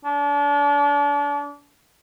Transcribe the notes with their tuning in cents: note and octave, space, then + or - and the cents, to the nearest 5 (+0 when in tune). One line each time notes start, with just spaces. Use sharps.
D4 -35